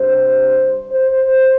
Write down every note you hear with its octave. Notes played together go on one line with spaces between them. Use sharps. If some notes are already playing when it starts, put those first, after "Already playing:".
Already playing: C3 G3 D4 C5
C5